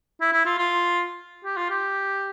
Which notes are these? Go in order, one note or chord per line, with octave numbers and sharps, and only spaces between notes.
E4
E4
F4
F4
G4
F4
G4